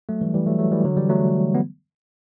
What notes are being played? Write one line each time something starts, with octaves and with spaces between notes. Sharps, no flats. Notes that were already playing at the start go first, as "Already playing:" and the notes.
F#3 A3
E3 G3
E3 G3
F#3 A3
F#3 A3
E3 G3
D3 F#3
E3 G3
F#3 A3
B3